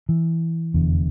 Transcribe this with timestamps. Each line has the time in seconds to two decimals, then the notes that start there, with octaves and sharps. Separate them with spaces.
0.09 E3
0.74 F1 E2 D3